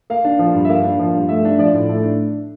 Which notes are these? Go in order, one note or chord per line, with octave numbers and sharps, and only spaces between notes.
A#3 F5
D4
F3
G2
E5
A#3 F5
D4
F3
G2
A3 E5
D4
F3 D5
A2
A3
D4